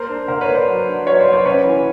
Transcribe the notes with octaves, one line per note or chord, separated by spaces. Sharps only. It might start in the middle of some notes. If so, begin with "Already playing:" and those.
Already playing: A#3 A#4 C5
D4
D3 A#4 C5
B4 C#5
A#3
C5 D5
F#3
D4
F#3 B4 C#5
C5 D5
F#3
C5 D5
C#4 B4 C#5
E3